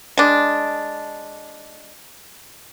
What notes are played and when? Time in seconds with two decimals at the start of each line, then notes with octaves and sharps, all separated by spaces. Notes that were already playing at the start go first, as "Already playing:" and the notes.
0.18 G#3 D4